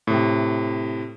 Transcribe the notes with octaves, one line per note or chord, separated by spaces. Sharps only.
A2 C3